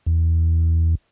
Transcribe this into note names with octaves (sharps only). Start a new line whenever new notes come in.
E2